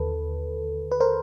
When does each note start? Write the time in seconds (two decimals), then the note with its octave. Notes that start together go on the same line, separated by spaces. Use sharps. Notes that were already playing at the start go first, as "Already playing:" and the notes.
Already playing: D#2 D3 A4 B4
0.92 B4
1.00 A#4 C5